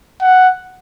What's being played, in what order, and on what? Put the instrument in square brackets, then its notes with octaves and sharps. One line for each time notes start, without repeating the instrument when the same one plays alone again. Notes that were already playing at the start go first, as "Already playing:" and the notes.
[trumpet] F#5